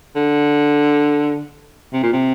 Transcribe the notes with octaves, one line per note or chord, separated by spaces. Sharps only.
D3
C3
A#2
C3